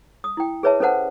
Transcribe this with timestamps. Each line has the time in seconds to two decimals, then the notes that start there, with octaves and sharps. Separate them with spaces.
0.24 D#6
0.37 E4 G5
0.63 G#4 B4 C#5 E5 A5
0.80 C#4 A4 B4 C5 F#5 A5